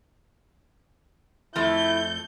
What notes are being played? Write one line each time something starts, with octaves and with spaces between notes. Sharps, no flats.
F2 A3 E4 G6